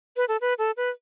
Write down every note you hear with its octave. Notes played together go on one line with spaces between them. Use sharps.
B4
A4
B4
A4
B4